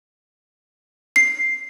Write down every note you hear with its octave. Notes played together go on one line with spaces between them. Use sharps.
C7